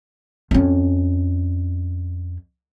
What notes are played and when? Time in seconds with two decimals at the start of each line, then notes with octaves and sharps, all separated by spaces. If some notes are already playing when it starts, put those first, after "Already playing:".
0.51 F2 C#4